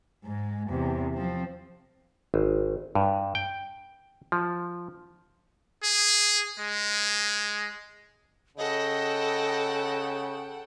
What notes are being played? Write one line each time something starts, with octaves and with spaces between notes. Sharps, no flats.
G#2 G#3
E2 C3
F3 C4
G#1
G2
G5
F3
G#4
G#3
C#3 A4 D#5 F#5 G5